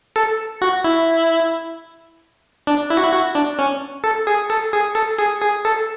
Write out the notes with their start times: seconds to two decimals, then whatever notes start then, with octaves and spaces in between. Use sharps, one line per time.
0.16 A4
0.62 F#4
0.84 E4
2.67 D4
2.90 E4
2.97 F#4
3.04 E4
3.12 F#4
3.35 D4
3.59 C#4
4.04 A4
4.27 G#4
4.50 A4
4.73 G#4
4.95 A4
5.19 G#4
5.42 G#4
5.65 A4